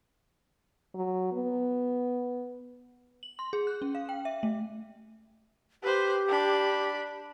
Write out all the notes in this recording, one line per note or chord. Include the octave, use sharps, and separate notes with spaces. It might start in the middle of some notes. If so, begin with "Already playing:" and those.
F#3
B3
F#7
C6
G#4
F#6
C#4
F5
G5
E5
A3
G4 B4 C5
D4 B5